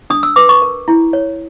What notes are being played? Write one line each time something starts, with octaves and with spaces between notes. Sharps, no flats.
D4 D#6
E6
B4 D6
C#6
A#4
E4
C#5